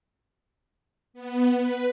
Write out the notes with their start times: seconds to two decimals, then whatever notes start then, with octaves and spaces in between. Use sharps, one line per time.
1.13 B3
1.56 B4